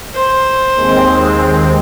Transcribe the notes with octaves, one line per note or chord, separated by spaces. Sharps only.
C5
D#2 G#3 C4